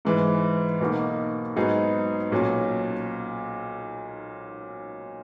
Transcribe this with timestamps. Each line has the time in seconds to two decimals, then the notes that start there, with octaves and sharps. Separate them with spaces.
0.05 G#2 E3 G#3
0.80 B1 B2 A#3 D#4 F#4
1.56 G#2 F#3 B3 D#4 G#4
2.32 B1 A#2 F#3 C#4